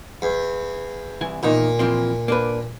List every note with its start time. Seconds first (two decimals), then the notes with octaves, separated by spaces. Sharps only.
0.22 E2
1.21 C2 E3 G#5
1.43 E2 A#2 D#3 D#4
1.79 E3 F3 C4
2.28 A#3 D4 B4